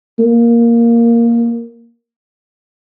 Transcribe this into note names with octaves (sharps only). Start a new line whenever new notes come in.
A#3